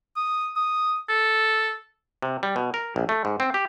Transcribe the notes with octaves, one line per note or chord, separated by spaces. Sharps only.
D#6
D#6
A4
C3
G3
B2
A#4
A#1
A3
G#2
C4
G4